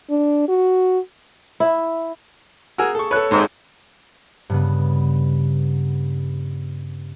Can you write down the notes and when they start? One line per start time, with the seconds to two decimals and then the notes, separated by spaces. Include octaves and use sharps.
0.10 D4
0.49 F#4
1.60 E4
2.78 F#4 G#4 A#4 G#5 E6
2.95 A4 C#6
3.11 A4 B4 C#5 F#6
3.31 G#1 G#2
4.50 G2 C#3 B3